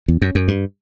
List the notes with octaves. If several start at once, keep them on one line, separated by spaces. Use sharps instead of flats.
E2
F#2
F#2
G2